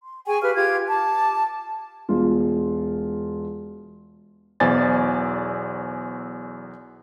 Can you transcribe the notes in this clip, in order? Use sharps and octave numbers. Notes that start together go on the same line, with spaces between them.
C6
G#4 G5 G#5 C#6
G4 B4 F5 F6
F4 G4 C6 G#6
A5 D6
E1 F4
B1 E2 C5 D5 G#5 A6